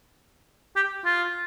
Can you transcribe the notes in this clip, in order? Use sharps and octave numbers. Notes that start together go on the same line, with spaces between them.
G4
F4